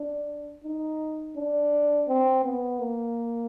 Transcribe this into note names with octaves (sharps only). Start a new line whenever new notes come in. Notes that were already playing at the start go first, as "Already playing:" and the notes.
Already playing: D4
D#4
D4
C4
B3
A#3